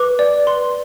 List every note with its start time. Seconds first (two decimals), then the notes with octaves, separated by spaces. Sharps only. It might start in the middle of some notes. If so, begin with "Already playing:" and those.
Already playing: B4 D6
0.19 D5
0.47 B4 C6